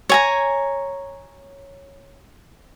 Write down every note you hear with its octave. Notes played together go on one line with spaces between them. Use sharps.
C#5 G#5 A#5